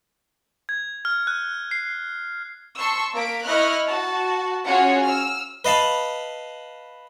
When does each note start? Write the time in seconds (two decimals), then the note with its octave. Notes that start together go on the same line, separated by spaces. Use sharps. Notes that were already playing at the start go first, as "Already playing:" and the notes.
0.69 G#6
1.05 F6
1.27 F#6
1.71 C7
2.75 A5 C6 C#6 E6
3.15 A#3 A#4 B6 D7
3.45 E4 D#5 C#6 F6 F#6
3.87 F#4 A5
4.66 C#4 F4 F#4 G#4 C#5 F#5
5.05 E6 F6
5.65 B4 D#5 F5 A5 B5